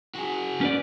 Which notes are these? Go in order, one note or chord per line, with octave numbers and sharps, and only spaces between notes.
F#4 G#4
C#4 B4 D5